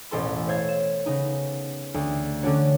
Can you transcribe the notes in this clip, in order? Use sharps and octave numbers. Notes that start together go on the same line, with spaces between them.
E1 A1 A4 C6
C5 C#5 F5 E6 G#6 A6
E7
C#3 B3 D#4
D2
D3 C#4 D4 F#4 C#5